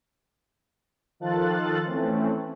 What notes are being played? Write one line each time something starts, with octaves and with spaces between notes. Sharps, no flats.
D#3 F3 F4 A4 F#6 A6
E3 A3 C4 C#4